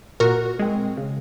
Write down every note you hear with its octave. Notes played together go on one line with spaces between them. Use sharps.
A#2 F#4 A#4
G#3 C4
C#3